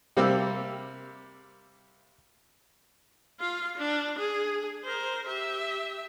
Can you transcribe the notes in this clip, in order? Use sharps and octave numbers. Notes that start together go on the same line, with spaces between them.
C3 G3 A#3 C4 D6 E6
F4 F5
D4
G#4
A#4 C5
G4 E5